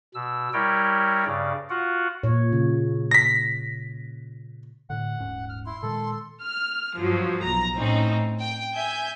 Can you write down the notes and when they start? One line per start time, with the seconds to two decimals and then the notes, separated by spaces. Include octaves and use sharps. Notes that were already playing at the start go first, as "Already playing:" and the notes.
0.14 B2 E6
0.53 G3 E4 A#4 C#5 G5
1.26 G2 C#3 D5
1.70 F4 F#4 F#5
2.23 A#2 C#5
2.53 C#3
3.11 A#6 B6
4.90 A2 D3 F#5
5.18 D#1 G#2 C#4
5.49 F6
5.66 E4 C6
5.82 A#2 D#3 G#3 A4
6.42 F6
6.96 G2 F3 F#3
7.43 B1 A#5
7.74 A2 C4 C#4 D#4
8.39 G5
8.74 E5 G#5 G6